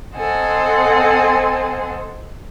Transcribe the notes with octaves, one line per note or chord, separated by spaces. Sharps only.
C4 A4 C5 D#5 F#5 G#5